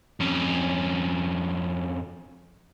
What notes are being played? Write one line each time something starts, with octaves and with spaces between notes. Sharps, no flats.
F2 C#4